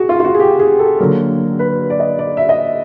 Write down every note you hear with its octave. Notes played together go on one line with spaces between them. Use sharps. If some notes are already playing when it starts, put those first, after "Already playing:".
Already playing: F#4 G#4
F4
F4
F#4
G#4
G4
G#4
A4
D3 F#3 A#3 A#4
B4
D5
D#5
D5
E5
D#5